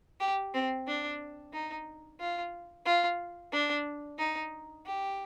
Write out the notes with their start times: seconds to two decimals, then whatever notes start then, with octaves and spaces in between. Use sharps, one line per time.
0.20 G4
0.54 C4
0.87 D4
1.53 D#4
2.20 F4
2.85 F4
3.52 D4
4.18 D#4
4.85 G4